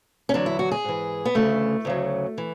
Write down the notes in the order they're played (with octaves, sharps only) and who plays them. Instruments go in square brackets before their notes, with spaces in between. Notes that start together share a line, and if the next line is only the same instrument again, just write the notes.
[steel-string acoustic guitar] C#4
E2 D3 F#3 D4
E4
F#4
G#4
G#2 E3
B3
D2 C#3 E3 A3
D2 C#3 F#3
E3